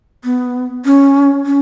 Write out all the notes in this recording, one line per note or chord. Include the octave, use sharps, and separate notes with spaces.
B3
C#4
C#4